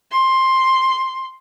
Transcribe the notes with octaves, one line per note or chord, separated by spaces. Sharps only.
C6